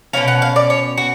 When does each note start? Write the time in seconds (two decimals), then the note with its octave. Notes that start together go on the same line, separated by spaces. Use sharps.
0.13 B2 F#3 C#4 F5
0.28 F#5
0.42 F5
0.56 D5
0.70 C#5
0.98 F#4